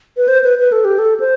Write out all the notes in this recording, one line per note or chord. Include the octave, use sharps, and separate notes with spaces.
B4
C5
B4
B4
A4
G4
A4
C5